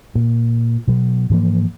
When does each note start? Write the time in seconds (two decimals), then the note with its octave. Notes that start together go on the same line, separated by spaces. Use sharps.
0.15 A#2
0.88 B2 F#3
1.30 G#2 E3 F3 A#3